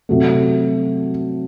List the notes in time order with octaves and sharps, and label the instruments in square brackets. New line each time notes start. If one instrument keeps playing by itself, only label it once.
[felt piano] C3 F#3 A3